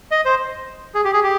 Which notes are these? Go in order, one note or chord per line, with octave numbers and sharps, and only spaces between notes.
D#5
C5
G#4
G4
G#4
G4